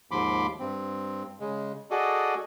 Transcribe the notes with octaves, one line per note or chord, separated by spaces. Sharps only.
D#2 G#2 F3 B5 C6 D6
G2 C4
C#3 G#3
F#4 G#4 A4 D5 D#5